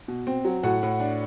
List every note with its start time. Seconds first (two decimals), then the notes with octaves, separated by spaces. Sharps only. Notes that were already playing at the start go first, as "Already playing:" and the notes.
0.08 B2
0.27 C4
0.45 F#3
0.63 A2 F#4 F#5
0.83 A2
1.00 D4